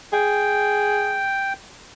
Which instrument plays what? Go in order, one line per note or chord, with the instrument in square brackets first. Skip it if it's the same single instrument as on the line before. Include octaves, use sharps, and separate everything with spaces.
[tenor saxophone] G#4 [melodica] G5